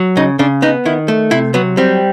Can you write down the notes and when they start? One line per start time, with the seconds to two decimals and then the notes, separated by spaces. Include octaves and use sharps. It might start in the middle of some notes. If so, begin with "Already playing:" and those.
Already playing: F#3
0.17 C#3 D#4
0.39 C#3 D4
0.62 B3 D#4
0.85 D#3 E4
1.08 A3
1.31 C3 E4
1.54 F#3 B3
1.77 G3 C4